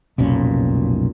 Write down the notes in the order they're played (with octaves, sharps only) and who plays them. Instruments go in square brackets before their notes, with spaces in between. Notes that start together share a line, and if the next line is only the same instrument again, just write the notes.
[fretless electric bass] F1 B1 A#2 C#4